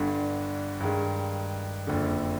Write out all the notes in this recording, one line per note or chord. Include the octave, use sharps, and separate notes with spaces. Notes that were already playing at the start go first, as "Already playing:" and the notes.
Already playing: G1 G2 D3
G2 D#3 G#3
F#1 F2 D3